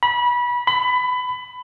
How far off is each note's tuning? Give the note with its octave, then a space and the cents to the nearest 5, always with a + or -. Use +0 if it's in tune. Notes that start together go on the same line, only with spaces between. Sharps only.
B5 -25
B5 +20